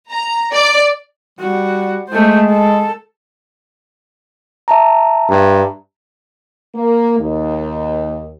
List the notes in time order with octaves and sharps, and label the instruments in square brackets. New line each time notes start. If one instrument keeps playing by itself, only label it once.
[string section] A#5
D5
[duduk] G3 [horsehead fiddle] F#4
[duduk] G#3 [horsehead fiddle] A3 C5
[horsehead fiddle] A4
[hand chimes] E5 A5 A#5
[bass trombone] G2
[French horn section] A#3
D#2